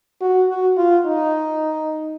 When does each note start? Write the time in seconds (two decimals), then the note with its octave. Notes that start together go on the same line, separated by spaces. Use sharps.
0.21 F#4
0.50 F#4
0.77 F4
1.06 D#4